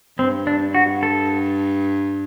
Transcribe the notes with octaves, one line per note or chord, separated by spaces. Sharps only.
G2 C4
D4
F#4
A4